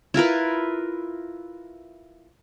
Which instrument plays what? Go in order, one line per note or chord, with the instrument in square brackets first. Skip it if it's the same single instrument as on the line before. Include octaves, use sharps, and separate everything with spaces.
[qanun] E4 F4 A#4 B4